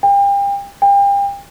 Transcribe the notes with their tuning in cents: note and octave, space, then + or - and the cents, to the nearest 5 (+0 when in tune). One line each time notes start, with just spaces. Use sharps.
G5 +35
G5 +35